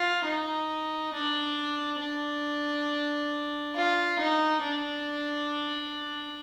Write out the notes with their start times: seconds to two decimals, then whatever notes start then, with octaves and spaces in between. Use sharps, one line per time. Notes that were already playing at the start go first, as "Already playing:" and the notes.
Already playing: F4
0.25 D#4
1.14 D4
2.00 D4
3.75 F4
4.19 D#4
4.63 D4